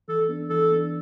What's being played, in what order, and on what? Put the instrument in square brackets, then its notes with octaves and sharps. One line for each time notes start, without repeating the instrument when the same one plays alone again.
[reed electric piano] E3 [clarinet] A4
[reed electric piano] B3 D4
[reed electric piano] E3 [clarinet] A4
[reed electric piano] B3 D4